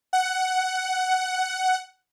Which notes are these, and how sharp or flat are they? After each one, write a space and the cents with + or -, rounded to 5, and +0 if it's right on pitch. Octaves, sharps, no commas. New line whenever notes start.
F#5 +10